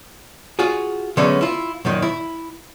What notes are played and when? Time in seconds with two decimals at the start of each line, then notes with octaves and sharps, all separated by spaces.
0.59 F4 F#4 G#4
1.17 D3 F#3 G#3 A3 B3 C#4
1.41 E4 F4
1.85 F#2 A#2 D#3
2.02 E4